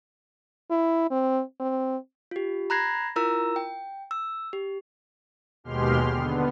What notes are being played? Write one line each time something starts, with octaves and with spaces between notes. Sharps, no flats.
E4
C4
C4
F4 G4
A#5 B5 F#6 G#6 A#6 C7
E4 F4 A#4 A#5 E6
G5
E6
G4
D#2 B2 G#3 G4 C6 F6
D3 B3